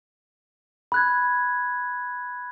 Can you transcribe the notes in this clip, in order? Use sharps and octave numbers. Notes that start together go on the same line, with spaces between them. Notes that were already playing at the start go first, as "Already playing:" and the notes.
B5 F#6 G#6